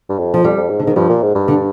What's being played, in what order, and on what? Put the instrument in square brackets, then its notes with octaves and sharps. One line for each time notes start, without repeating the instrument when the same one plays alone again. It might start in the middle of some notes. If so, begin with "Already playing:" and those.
[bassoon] G2
F2
[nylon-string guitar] F3
[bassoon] F2 [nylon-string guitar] G3
[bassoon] F2
G#2
[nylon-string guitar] D3
[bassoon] G#2 [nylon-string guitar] D#3
[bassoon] G2 [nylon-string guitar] F3
[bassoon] A#2
G#2
G2
[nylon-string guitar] D3